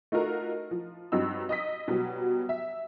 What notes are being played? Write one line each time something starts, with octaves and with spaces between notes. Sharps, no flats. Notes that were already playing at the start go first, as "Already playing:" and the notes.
A3 D#4 F4 F#4 A#4
F3
G2 F#3 C4 D#4 E6
D#5 D#6 B6
B2 F#3 G3
E5